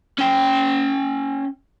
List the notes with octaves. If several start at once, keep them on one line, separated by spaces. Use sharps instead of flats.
C#4 G5